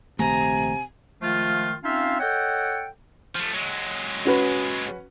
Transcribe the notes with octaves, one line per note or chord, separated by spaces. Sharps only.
A#1 C3 D#3 A3 G#5 A#5
D#3 F3 G#3 A3 F4
C4 C#4 D#4 F4 E5 F5
A4 C#5 D#5 F#5 G5
F3 A3
F#3 G#3
C#4 F#4 B4